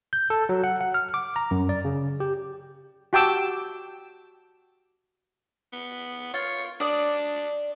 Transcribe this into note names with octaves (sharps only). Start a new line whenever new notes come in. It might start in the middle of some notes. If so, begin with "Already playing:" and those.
G6
A4
F#3
F#5
F#5
F6
D6
A#5
F#2
D5
C#3
G4
F#4 G4 G5 A5 D6 E6
B3
F4 C#5
D4 D5 D#6